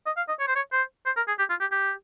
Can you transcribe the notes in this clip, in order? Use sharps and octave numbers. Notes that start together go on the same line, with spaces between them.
D#5
F5
D#5
C#5
C5
C#5
C5
C5
A#4
G#4
G4
F4
G4
G4